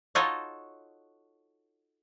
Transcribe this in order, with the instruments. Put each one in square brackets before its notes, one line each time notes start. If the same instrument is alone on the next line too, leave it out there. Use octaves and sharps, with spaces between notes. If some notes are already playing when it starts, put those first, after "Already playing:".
[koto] D#4 F4 F#4 A4 C#5 D#5